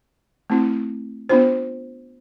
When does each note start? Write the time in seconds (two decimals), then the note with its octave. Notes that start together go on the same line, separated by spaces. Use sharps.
0.50 A3 C4 E4
1.29 B3 D4 F4 C5